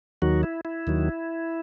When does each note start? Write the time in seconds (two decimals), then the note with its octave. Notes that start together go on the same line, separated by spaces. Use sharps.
0.22 D#2 D#3 F#3 F#4
0.43 E4
0.65 E4
0.87 D#2 D#3 F#3